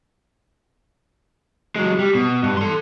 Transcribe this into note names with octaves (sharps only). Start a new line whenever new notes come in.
F#3 G#3
G3
B2
G2
A4 C6